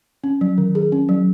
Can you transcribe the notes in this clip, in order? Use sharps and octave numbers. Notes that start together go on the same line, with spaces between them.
C#4
F#3
D#3
G#4
C#4
F#3